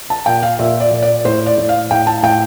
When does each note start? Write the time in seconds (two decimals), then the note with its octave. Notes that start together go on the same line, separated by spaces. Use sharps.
0.10 A5
0.26 A#2 G5
0.43 F5
0.59 A#2 E5
0.80 D5
0.91 A#2
1.02 D5
1.24 A2 C5
1.46 D5
1.57 A2
1.69 F5
1.91 A2 G5
2.07 A5
2.23 A2 G5